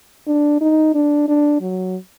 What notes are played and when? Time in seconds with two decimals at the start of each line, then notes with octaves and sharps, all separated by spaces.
0.27 D4
0.61 D#4
0.95 D4
1.28 D4
1.61 F#3